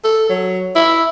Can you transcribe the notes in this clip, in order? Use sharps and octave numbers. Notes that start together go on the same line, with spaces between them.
A4
F#3
E4